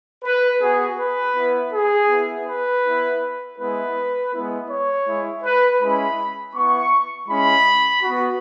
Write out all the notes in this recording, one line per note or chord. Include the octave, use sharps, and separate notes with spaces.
B4
B3 F#4 G#4
B4
B3 E4
G#4
B3 E4
B4
B3 E4
G#3 B3 E4 B4
G#3 B3 E4
C#5
G#3 E4
B4
G#3 C#4 E4 B5
B3 E4 C#6
G#3 C#4 E4 B5
B3 F#4